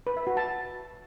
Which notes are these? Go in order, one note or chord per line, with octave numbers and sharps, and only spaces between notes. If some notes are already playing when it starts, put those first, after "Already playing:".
B4
E5
F#4
A5